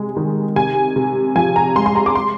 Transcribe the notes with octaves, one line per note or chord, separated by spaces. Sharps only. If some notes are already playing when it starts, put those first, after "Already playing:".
Already playing: C3 G#3
D#3
C3 G#5
C3
F3 G#5
A#5
G#3 C6
C6
A#5
D6
C6